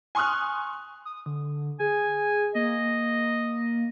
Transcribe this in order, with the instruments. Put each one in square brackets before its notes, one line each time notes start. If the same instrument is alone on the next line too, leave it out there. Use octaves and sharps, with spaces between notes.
[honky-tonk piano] G#5 C6 C#6 D#6 F6 F#6
[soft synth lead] D#6
D3
[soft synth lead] G#4 [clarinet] G#5
[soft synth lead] A#3 [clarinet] D#5